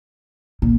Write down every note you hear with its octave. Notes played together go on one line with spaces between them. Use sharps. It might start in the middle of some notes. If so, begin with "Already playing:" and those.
A#2